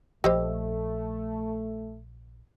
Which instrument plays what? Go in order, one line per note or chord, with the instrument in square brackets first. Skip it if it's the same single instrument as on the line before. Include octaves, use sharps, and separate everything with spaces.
[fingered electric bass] A#1 F3 [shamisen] G3 G4 [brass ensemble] A3 [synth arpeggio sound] C5 D#5 E6